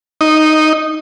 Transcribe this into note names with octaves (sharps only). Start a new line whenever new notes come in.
D#4